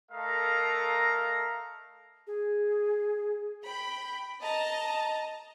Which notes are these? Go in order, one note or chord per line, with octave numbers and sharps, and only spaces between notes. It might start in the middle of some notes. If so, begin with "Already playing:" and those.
A3 A4 A#4 D#5 F5 A#5
G#4
G5 B5
D#5 A5 A#5